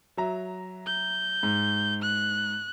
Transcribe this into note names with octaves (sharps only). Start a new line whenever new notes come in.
F#3 E5 A#5
G6
G#2
F#6